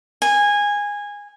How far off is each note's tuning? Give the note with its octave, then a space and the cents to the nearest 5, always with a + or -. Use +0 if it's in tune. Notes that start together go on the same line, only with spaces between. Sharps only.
G#5 -15